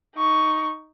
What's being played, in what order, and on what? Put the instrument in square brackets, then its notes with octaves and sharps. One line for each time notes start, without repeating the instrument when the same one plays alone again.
[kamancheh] D#4 C#6